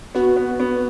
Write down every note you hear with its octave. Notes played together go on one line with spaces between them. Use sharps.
B3 F#4
B3
B3